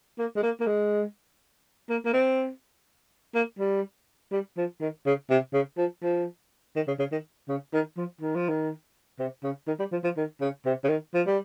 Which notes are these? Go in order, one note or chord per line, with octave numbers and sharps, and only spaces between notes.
A#3
G#3
A#3
A#3
G#3
A#3
A#3
C4
A#3
G3
G3
F3
D#3
C#3
C3
C#3
F3
F3
D#3
C#3
C#3
D#3
C#3
D#3
F3
D#3
F3
D#3
C3
C#3
D#3
G3
F3
F3
D#3
C#3
C3
C#3
D#3
F3
G3